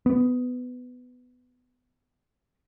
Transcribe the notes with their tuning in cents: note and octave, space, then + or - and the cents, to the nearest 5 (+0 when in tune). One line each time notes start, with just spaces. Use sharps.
B3 +15